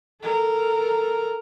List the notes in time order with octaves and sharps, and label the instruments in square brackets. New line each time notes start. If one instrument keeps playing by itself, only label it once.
[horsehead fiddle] A4 A#4